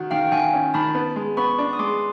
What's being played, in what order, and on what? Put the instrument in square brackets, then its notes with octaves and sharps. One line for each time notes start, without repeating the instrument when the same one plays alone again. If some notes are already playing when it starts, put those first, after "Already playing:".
Already playing: [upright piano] D#3 F#4
[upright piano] D#3 [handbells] F5 G5
[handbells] G5
[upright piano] D#3 [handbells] F#5 G#5
[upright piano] C#4
[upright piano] D#3 [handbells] A5 B5
[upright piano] B3
G#3
[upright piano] B3 [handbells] B5 C#6
[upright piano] D4
[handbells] D#6
[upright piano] G#3 [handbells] C6 D6